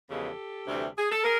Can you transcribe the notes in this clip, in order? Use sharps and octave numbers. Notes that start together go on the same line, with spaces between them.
E2 C#3 F3 G#3 B3 G4 A4
D2 C3 E3 G3 C4
G#4
A4
G#4 A#4